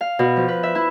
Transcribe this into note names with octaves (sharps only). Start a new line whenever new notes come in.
F5
B2
F3
B4
E5
E4